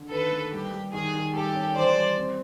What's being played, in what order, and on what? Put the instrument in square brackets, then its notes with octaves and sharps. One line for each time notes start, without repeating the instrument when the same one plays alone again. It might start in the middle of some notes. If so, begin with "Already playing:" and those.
Already playing: [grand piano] D3
[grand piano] D#3 [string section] A4 B4
[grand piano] A#3
[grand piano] G3 [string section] G4
[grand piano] G3
[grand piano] D#3 [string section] G#4
[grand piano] D#3
[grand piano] G3 [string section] G4 A4
[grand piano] C#4
[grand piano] E3 [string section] C5 D5
[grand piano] G3
C4